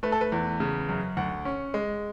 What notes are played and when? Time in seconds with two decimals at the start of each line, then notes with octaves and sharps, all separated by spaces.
0.03 A3 B4
0.12 A4
0.21 B4
0.32 E2
0.60 C#3
0.89 F#2
1.17 D2 F#5
1.45 C#4
1.74 G#3